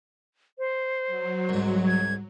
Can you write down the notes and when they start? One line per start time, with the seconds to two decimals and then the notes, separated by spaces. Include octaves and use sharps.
0.58 C5
1.07 F#3
1.49 C2 G#2
1.87 G#6